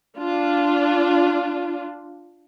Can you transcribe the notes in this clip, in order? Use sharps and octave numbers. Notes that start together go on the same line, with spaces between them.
D4 F4